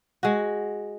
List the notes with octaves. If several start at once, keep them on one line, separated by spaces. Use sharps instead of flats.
G#3 F#4